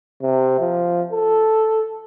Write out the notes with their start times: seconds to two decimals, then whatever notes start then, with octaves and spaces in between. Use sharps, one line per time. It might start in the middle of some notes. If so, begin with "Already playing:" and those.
0.22 C3
0.60 F3
1.12 A4